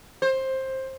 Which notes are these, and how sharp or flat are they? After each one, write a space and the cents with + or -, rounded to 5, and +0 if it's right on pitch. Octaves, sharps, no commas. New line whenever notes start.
C5 +15